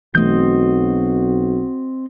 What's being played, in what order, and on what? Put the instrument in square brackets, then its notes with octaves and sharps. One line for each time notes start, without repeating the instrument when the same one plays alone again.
[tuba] B1 [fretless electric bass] E3 A3 [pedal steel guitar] C4 D#5 G6 [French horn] F#4